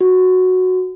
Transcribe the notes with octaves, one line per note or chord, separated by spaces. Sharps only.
F#4